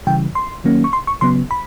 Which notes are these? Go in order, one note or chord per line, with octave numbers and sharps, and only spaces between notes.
C#3 E3 G3 G5
C6
D#3 F#3 A#3 C#4
C#6
C6
C#6
C#3 F#3 B3 C6
B5